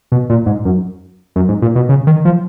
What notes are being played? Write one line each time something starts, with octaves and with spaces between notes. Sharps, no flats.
B2
A#2
G#2
F#2
F#2
G#2
A#2
B2
C#3
D#3
F3